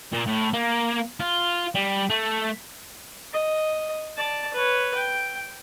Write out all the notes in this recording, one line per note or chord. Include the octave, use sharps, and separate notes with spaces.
A#2
A2
A#3
F4
G3
A3
D#5
D5 A5
B4 C#5
G5